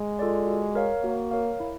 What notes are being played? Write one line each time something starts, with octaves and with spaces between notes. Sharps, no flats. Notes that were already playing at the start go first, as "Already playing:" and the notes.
Already playing: G#3
F4 A4 D5
F#4
A#4 C#5 F5
A#3 F#4
A#4 C#5 F5
E4